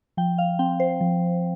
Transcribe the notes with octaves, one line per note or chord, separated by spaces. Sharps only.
F3 G5
F5
C4 G5
C5
F3